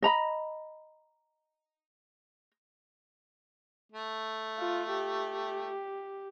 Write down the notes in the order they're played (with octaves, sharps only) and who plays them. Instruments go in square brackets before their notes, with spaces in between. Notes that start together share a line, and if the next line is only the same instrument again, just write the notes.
[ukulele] D#5 A#5 B5
[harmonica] A3
[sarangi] F4
G4